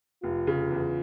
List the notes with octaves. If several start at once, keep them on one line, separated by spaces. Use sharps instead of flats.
F1 F4
C#3
E2